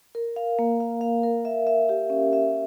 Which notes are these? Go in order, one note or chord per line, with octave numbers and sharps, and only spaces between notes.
A#4
F5
A#3
F5
F5
A#4
E5
E5
G4
C#4
E5